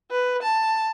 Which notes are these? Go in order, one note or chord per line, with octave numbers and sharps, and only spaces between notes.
B4
A5